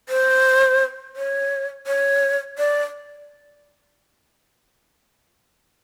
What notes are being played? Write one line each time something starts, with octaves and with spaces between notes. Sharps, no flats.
C5
C#5
C#5
D5